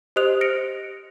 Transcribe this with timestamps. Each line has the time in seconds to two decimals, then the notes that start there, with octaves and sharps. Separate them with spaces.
0.16 G4 C5 D#5 D#6 F#6 F7
0.41 F6 A#6 C#7 D7